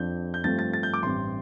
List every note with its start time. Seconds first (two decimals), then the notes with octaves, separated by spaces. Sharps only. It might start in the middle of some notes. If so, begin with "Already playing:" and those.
Already playing: F2 F3 D4 G6
0.34 G6
0.44 G2 F3 A3 C4 A6
0.59 A6
0.74 A6
0.83 G6
0.94 D6
1.02 A1 G2 G3 C4 C6